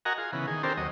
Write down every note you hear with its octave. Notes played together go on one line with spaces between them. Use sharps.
F#4 A#4 D#5 F#5 G#5 A#5
F4 G#4
C#3 E3 B3
D#3 G#4
C4 D4 G4 A4 A#4 C5
D#2 F#3 D#5